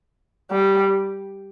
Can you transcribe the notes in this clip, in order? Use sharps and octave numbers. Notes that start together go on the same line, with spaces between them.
G3